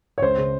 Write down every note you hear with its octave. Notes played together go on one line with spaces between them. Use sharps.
C#5
C#2 C5
C#3